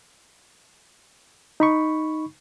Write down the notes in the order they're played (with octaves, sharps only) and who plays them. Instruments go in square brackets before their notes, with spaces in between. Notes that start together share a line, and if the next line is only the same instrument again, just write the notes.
[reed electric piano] D#4 B5 C#6